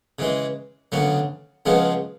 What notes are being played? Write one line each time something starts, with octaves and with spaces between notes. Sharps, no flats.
C#3 E3 G#3
D2 C#3 F#3 B3
C#2 C#3 F3 G#3 B3